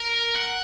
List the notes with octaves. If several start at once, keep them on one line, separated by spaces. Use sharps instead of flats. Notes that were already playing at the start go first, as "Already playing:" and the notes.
Already playing: A#4
F#5